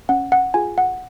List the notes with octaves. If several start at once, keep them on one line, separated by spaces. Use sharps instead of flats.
C#4 F#5
F#5
F4 G#4 G#5
F#5